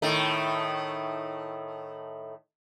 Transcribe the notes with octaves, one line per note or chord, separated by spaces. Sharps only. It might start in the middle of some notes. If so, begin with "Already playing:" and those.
A2 D#3 A3